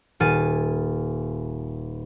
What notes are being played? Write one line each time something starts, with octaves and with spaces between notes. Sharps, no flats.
D#1 G#5 F6 A6 D#7